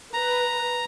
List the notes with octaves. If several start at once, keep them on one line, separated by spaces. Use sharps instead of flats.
B4 A#5